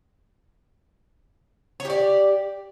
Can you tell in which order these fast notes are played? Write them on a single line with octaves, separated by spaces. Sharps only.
C#5 G4 D5